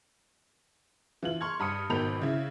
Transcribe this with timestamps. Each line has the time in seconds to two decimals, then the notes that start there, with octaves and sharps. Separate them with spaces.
1.23 E3 F4 F#7
1.41 C6 C#6 F6 G#6
1.60 G2 B5 D#6 C#7
1.90 G#1 B2 D#3 B5 G6 F7
2.22 C#3 E4